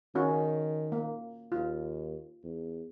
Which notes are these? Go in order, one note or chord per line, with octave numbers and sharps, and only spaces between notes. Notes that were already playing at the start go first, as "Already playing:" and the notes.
D#3 C#4 F#4
A#3
D#2 F4
E2